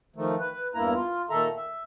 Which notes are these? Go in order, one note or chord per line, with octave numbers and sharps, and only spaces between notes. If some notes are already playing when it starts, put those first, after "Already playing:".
D#3 F3 A3
B4
E2 G2 A#3 E4 A#5
F4
A#2 D#3 A4 E5 A#5
E5